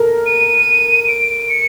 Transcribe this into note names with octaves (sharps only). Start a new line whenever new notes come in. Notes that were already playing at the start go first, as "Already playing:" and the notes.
Already playing: A4 A#4
D#7
D7
C#7